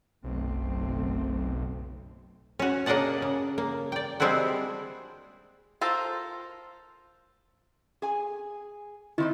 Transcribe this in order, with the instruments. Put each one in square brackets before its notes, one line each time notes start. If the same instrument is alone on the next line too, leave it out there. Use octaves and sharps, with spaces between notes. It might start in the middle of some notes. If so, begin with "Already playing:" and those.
[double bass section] F#1 A3 C4 [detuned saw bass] B1
[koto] C#4 F#4
C#3 A#3 D4 D#5 F#5 A5
C#3
A#3
D5 G5
G3 G#3 C4 D4 E4 F#4
[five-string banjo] F4 A4 A#4 C5
[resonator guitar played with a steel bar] G#4 G#5
[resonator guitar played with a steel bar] D#3 C4 D#4 [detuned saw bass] E4